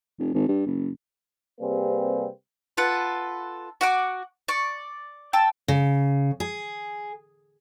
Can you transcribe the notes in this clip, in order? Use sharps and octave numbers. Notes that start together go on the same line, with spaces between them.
F1
G#1
G2
F#1
C3 G3 A#3 C4 G#4 B4
F4 A4 B4 F#5
F#4 F#5 D6
D5 C#6
G5 A5 E6
C#3
G#4